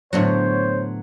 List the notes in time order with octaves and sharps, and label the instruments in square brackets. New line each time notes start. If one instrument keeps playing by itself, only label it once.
[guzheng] A2 D3 F#4 [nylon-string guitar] F#3 B3 [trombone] C5 [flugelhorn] C#5